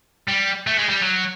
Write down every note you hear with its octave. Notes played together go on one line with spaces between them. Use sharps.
G3
A3
G#3
G3
F#3